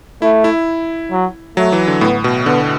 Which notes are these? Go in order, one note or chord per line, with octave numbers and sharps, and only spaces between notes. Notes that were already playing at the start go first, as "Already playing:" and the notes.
A3 E4
E4
F#3
F#3 A3
E3
D3
A2 B3
B2
D3 B3